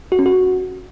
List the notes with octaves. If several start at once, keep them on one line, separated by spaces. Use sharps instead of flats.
F#4
C#4
F#4